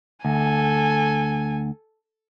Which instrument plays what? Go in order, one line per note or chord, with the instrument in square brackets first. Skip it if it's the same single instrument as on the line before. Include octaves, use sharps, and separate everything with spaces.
[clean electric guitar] D2 [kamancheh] A4 G#5